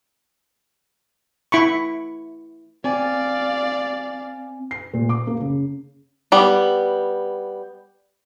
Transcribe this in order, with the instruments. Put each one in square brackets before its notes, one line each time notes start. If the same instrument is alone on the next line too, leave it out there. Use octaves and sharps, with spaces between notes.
[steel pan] E4 B5 C#6
[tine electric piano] C4 G#5 [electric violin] D5 F5
[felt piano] C7
A#2
D6
A#3
C#3
[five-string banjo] G3 B3